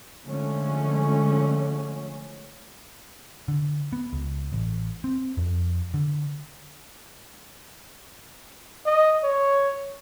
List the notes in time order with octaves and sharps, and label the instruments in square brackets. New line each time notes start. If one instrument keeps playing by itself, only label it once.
[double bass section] D3 F3 G#3 A3 C#4
[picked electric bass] D3
B3
C#2
A1
C4
F2
D3
[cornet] D#5
C#5